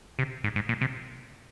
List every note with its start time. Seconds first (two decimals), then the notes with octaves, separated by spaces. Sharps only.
0.19 C3
0.44 G#2
0.56 G#2
0.69 A#2
0.81 C3